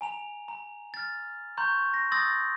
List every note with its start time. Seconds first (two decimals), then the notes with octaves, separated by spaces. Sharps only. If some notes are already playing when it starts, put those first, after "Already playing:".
0.01 G#5 A#5 F7
0.48 A#5
0.94 F6 A6
1.58 A#5 C6 C#6 G6
1.94 A#6
2.12 C6 D#6 E6 G6 A6 A#6